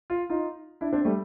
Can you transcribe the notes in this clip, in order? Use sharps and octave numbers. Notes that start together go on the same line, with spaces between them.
F4
D#4 F4
D4 E4
C4 D4
G3 A3